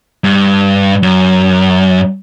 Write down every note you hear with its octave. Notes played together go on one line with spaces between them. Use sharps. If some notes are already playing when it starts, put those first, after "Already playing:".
G2
F#2